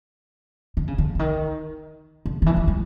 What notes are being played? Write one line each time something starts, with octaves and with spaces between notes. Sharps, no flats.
D3
C#3
D3
D3
D#3
D3
D#3
E3
F3
G3